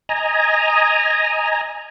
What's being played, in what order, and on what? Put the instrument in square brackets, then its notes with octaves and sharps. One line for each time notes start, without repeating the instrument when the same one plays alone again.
[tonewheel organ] D#5 G#5 A#5